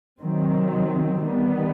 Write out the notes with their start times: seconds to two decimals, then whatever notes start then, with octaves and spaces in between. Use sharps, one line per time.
0.21 C3 D#3 F#3 C4
1.23 D#3 G3 B3